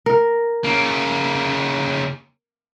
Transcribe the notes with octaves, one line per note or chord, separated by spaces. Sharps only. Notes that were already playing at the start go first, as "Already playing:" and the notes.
A#4
C#3 A#3